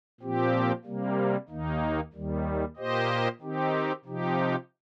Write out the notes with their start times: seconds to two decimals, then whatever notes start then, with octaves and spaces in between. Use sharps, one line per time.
0.21 A#2 F3 C4 G4
0.85 C3 G3 A#3
1.49 D#2 D#3 A#3 D#4
2.13 D#2 D#3 G3
2.77 A#2 A#3 G4 C5 D#5
3.40 D#3 C4 D#4 G4
4.05 C3 F3 D#4 G4